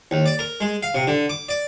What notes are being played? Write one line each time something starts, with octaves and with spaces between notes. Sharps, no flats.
D#2
D5
A#4
G#3
F5
C3
D3
D6
D5